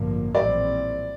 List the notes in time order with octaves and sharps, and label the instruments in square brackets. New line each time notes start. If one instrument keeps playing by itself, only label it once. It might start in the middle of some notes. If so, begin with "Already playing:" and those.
Already playing: [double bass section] A1 G2 D3 F3 A#3
[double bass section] A#1 A2 E3 G3 C4 [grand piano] D5